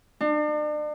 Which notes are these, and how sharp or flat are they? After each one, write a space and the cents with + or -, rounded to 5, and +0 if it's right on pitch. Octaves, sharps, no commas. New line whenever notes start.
D4 +40